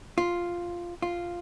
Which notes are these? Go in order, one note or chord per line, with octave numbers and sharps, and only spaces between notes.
F4
F4